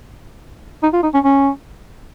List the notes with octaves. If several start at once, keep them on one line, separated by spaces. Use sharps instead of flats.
D#4
F4
D#4
C#4
C#4